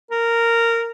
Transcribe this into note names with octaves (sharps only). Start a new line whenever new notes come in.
A#4